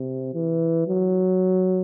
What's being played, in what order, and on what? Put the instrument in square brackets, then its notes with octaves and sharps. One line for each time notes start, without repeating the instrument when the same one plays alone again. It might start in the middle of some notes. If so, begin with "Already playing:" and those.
Already playing: [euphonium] C3
E3
F#3